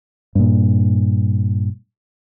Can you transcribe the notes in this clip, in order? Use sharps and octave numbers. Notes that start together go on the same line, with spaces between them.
G2 A#2